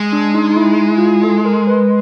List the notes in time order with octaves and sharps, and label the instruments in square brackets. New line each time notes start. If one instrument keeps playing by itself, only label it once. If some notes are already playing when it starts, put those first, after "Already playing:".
Already playing: [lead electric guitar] G#3
[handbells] D4
D#4
D#4
E4
E4
F4
E4
A4
A#4
B4